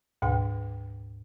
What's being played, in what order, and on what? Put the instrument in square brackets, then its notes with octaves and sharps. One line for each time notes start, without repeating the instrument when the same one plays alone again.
[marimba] D2 G#2 B2 G5